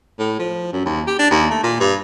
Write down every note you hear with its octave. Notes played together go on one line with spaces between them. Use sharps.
A2
F3
F#2
D#2
G4
D4
D#2
A3
A#2
G2